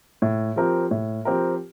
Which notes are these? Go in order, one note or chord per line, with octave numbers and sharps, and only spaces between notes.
A2
F3 C4 G4 A#4
A2
F3 C4 G4 A#4